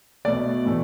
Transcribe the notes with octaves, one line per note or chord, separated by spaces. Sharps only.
B2 A3 D5
A2 E3 A3